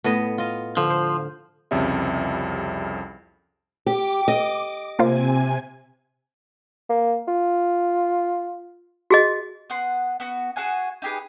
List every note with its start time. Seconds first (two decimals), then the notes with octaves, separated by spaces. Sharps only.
0.04 A2 B3 D#5
0.38 F4 D#5
0.77 D3 F3
0.90 C5
1.71 C2 F2 C#3 G3 E5
3.86 G4 D6
4.28 D#5
4.99 C3 A#3 F4 C5 G#5
6.89 A#3
7.28 F4
9.10 F#4 G#4 D#5
9.70 B3 F#5 C6
10.20 B3 F#4
10.56 F#4 G#4 F#5 G#5
11.02 D#4 G4 G#4 B4